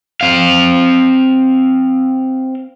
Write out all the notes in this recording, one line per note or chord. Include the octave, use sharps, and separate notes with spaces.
C4 F5